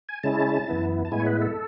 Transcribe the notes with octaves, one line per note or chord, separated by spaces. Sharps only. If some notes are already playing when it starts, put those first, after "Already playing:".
G#5
C#3 G#3 C#4 E4 A5
F#2 E3 B3 E4
A5
A2 G#3 B3 E4 G#5
C#5
B4
A4